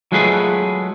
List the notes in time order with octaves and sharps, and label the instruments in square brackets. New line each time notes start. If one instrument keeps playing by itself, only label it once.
[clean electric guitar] F#3 G#3 A3 F4 G#4 B4